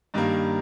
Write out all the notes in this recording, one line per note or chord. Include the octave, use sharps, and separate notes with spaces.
G2 D#3 G3 A#3